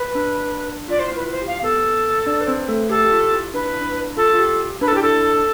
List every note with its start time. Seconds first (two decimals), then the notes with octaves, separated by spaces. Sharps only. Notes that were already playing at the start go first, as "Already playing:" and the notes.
Already playing: B4
0.15 D4
0.88 F4 D5
0.99 E4 C5
1.12 E4
1.15 B4
1.20 F4
1.31 C5
1.42 G4
1.47 F5
1.62 B3 A4 B4
2.26 D4 D5
2.41 B4
2.47 C4 C5
2.68 A3 A4
2.89 G4 A4
3.05 G4
3.11 F4
3.32 E4
3.53 D4 B4
3.68 E4
3.81 D4
4.17 F4 A4
4.34 F4
4.38 G4
4.81 D4 B4
4.88 A4
4.93 E4 G4
5.02 D4 A4